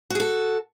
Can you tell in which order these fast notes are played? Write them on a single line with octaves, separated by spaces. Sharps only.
F#4 G#4 A4